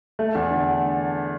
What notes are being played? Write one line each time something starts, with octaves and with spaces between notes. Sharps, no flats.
A3
E2
D3